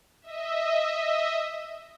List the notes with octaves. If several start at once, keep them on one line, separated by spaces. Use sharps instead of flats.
D#5 E5